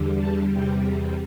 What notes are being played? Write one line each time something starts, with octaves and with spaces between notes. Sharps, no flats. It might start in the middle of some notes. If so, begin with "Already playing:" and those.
Already playing: E2 D3 G3
A5
E2 C3 G3 G5